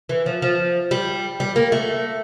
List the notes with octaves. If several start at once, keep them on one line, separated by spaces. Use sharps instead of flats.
E3
F3
F3
G3
G3
A#3
A3